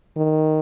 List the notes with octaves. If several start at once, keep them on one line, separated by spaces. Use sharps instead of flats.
D#3